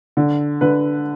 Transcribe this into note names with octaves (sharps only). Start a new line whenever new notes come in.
D3
D3 B4